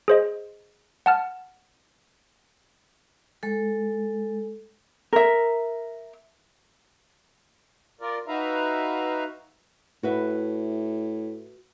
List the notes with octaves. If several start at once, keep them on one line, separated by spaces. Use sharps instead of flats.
G#4 C5 D#5
F#5 A5 F6
G#3 A4
A#4 E5
F4 A#4 D5
D#4 F#4 B4 E5 F5 A#5
A2 F#4 B4 E5